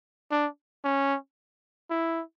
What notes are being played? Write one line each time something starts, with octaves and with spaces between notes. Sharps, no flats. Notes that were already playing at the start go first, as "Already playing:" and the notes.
D4
C#4
E4